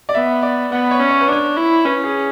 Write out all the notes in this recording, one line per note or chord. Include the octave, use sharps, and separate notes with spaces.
D5
B3 E5
D5
B3 F#5
C#5
C#4
C#5
B4
D4 C#5
E4
C#4 B4
G#4